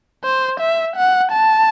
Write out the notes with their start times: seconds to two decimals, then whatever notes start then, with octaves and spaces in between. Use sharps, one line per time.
0.24 C5
0.60 E5
0.96 F#5
1.32 A5